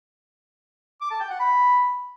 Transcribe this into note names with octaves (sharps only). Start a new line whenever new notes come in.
D6
A5
G5
F#5
B5